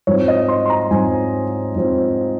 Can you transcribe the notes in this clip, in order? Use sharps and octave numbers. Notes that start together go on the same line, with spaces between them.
G#2 F3 C4 C#5
D#5
C6
C6
A#5
G#2 F3 C4 G#5
G#2 F3 C4